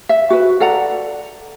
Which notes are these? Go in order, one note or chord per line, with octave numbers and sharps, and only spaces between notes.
E5
F#4 B4
A4 D5 F#5 A#5